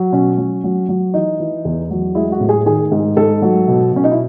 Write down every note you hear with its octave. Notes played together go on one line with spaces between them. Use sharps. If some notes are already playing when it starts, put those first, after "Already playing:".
Already playing: F#3
B2 C#4
F#3
F#3
F#3
E3 D#4
E3
E2
F#3
G#3 E4
F#4
A2
G#4
D#3 G#4
G#2
G#2 A4
F#3
B2
B2 C#4
D#4
E4